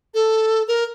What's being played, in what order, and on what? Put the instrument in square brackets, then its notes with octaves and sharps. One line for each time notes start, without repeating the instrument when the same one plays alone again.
[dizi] A4
A#4